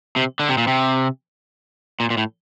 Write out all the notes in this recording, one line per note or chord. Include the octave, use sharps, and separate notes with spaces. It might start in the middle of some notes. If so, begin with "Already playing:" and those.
C3
D3
C3
A#2
C3
A#2
A#2
A2